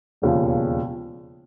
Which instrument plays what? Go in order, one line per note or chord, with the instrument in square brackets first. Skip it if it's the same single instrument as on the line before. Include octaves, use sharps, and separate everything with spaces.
[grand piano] E1 D#2 C#3 F3